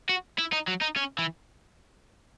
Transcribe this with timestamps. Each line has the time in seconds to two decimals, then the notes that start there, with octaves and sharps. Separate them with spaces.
0.09 F#4
0.38 E4
0.52 D#4
0.68 F#3
0.81 D#4
0.96 C#4
1.18 E3